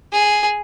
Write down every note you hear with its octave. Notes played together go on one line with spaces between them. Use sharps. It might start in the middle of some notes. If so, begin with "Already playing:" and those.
G#4